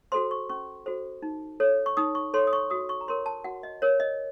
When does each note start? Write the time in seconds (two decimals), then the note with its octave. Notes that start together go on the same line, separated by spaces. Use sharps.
0.12 F#4 A4 C5 C6
0.31 C#6
0.50 C#4 C#6
0.86 F#4 A4 C5
1.22 D#4
1.60 A4 C#5
1.86 C#6
1.97 D#4 D#6
2.15 C#6
2.34 A4 C#5 C6
2.47 D#6
2.53 C#6
2.70 F#4 D#6
2.89 C#6
3.01 A#5
3.08 A#4 C#5 C6
3.26 A5
3.44 F#4 F#5
3.63 D#5
3.82 A#4 C#5
4.00 D#5